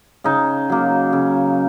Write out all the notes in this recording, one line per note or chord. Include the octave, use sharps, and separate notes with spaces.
C#3 D#4
F#3 A#3
C#3